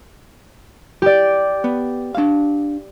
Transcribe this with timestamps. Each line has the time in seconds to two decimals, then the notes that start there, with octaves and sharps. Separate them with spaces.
1.02 G4 D5
1.64 B3
2.15 D4 F5